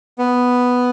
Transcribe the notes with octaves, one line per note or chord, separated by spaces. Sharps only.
B3